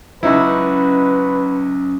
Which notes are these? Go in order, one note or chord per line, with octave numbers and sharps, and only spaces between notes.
C#2 F#3 C#4 D#4 E4 F#4 B4